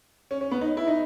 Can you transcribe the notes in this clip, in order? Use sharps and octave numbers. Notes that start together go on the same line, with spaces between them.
C#4
C#4
B3
D#4
E4
D#4